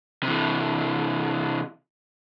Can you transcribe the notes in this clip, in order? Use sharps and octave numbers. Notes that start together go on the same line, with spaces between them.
C3 E3